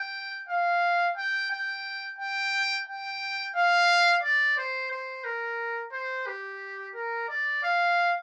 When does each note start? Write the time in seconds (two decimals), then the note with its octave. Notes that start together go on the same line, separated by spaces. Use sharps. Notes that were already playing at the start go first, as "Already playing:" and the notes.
Already playing: G5
0.49 F5
1.17 G5
1.51 G5
2.19 G5
2.87 G5
3.56 F5
4.23 D5
4.58 C5
4.91 C5
5.25 A#4
5.92 C5
6.26 G4
6.95 A#4
7.29 D5
7.64 F5